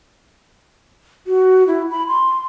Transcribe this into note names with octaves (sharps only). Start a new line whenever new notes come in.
F#4
E4
B5
C6